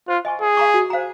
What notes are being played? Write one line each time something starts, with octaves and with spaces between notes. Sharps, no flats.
F4 C5
D#5 G#5 C#6
G#4 A#4
F5 A#5 C#6
F#4
C5 F5 A#5